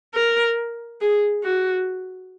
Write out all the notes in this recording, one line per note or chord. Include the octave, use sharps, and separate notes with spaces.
A#4
G#4
F#4